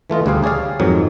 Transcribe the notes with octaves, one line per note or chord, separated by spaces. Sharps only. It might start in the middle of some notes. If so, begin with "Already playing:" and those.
E3 A3 F4 D#5
D2 G3 D4 G#4 F5
G4 G#4 C#5 D5 F5
F2 G#2 D#3 F#3